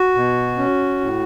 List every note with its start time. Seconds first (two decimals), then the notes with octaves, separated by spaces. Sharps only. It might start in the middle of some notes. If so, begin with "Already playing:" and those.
Already playing: F#4
0.15 B2
0.58 C#4
1.00 A2